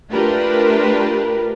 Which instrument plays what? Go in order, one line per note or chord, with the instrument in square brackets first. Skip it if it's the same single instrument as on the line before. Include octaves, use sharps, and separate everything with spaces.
[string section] A3 D4 F4 G4 A#4 B4